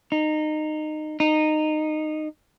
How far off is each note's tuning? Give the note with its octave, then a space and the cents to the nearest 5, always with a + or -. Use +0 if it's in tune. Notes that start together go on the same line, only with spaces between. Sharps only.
D#4 -20
D#4 -15